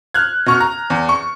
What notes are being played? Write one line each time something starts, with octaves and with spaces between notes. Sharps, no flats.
F6 F#6 G#6
B2 C#6 F6
A#5
E2
C#6